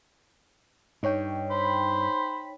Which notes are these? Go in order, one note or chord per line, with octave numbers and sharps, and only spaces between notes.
G2 D#4 C#5 G5
C5 B5